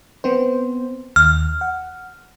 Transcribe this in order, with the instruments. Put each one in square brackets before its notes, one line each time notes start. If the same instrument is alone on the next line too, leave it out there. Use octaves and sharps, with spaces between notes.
[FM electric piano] B3 C4 C5
[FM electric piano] D#2 [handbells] F6
[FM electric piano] F#5